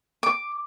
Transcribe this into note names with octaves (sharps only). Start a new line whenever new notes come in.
D6